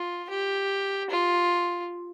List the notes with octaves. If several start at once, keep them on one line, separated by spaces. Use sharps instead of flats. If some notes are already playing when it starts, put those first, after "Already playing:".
Already playing: F4
G4
F4